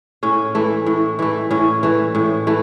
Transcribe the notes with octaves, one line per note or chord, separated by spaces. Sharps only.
A2 C#4
E3 A3
A2
E3 A3
A2 C#4
E3 A3
A2
E3 A3